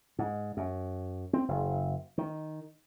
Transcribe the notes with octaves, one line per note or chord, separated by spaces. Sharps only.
G#2
F#2
C4
F#1
D#3